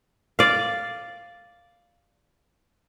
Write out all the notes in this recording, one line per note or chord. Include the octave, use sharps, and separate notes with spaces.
D5 F5